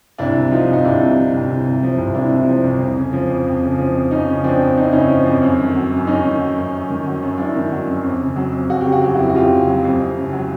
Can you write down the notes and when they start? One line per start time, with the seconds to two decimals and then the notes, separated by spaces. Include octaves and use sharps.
0.18 C2 D4 E4
0.35 C3
0.51 F3 D#4 F4
0.68 C2 D#4
0.84 C2 D4 E4
1.01 C3
1.17 F3
1.33 C2
1.50 C2
1.66 C3
1.83 F3
1.98 C2
2.15 C2 D4 E4
2.32 C3
2.49 F3
2.64 C2
2.80 F2
2.96 C#3
3.13 F3
3.30 F2
3.46 F2
3.63 C#3
3.78 F3
3.95 F2
4.11 F2 C#4 D#4
4.28 C#3
4.44 F3 C4 D4
4.61 F2
4.77 F2 D#4
4.84 E4
4.92 C#3 C#4 D#4
5.10 F3
5.26 F2
5.42 F#2
5.59 D#3
5.76 F#3
5.92 F#2
6.07 F#2 C#4 D#4
6.25 D#3
6.40 F#3
6.57 F#2
6.72 F#2
6.90 D#3
7.06 F#3
7.23 F#2
7.38 F#2 D4 E4
7.55 D#3
7.72 F#3
7.87 F#2
8.03 F2
8.21 C#3
8.36 F#3
8.53 F2
8.69 F2 F#4
8.81 C#3 G4
8.92 F#4
9.02 F#3 G4
9.14 E4 F#4
9.18 F2
9.29 F#4
9.35 F2 F4 G4
9.51 C#3
9.68 F#3
9.84 F2
10.00 F2
10.16 C#3
10.33 F#3